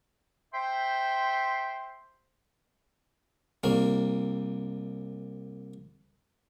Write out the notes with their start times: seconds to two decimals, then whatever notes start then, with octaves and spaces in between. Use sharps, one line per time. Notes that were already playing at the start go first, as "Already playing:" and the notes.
0.53 C5 E5 G5 C6
3.64 C2 A#3